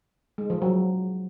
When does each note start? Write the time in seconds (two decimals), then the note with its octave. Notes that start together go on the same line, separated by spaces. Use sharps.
0.38 G#3
0.50 F3
0.62 F#3